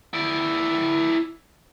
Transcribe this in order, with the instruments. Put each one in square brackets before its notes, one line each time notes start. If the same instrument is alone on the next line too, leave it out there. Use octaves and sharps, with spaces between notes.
[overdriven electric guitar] E4 D5